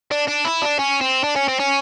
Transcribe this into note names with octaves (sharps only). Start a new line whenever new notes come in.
D4
D4
E4
D4
C#4
C4
D4
C#4
C4
C#4